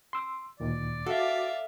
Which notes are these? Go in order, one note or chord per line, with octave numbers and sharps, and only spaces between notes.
C6 E6
D2 A#2 D#3 D5
F#4 A4 E5 F5